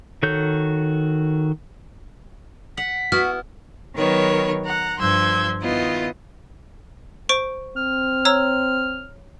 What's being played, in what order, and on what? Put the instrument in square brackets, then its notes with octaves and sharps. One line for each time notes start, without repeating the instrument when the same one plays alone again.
[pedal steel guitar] D#3 F#4 A4 C#5 G6
[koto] F#5 [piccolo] B6
[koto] B3 E4 [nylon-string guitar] F#4 [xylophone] F6
[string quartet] D#3 F#3 B3 A#4 B4 C#5
F#5 A#5
G2 F3 C6 E6 G6 G#6
D#3 B3 E4 F4 D#5
[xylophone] C5 C#6 D7
[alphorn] C4 [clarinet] F6
[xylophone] C#5 A#5 E6